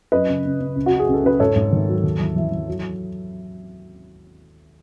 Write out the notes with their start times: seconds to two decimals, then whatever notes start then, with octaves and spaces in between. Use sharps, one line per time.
0.12 F#2 B4 D#5
0.28 C#3
0.45 C#3
0.60 C#3
0.76 C#2
0.86 F#4
0.93 C#2
0.99 G#4
1.08 C#2
1.14 A4
1.24 C#3 B4
1.40 G#2 A4 C#5
1.56 G#2
1.72 D#3
1.88 F#3
2.03 D#2
2.20 E3
2.36 E3
2.52 E3
2.68 F#3